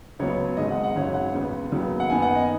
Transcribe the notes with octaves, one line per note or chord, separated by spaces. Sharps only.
C#2 C#3 F#3 B3 C#5
G#1 G#2 G#3 D#5
F#5
F#5
G#1 F#2 C#3 F#3 C#5
F#5
C#2 C#3 B3
D#2 C#3 F#3 B3
F#5
F#2 D#3 B3 G#5
F#5
D#5